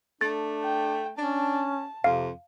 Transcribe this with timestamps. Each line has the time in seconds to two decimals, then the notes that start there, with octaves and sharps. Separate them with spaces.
0.21 A3 D4 A6
0.63 G5
1.18 C#4 D4 A5
2.04 F2 C3 F5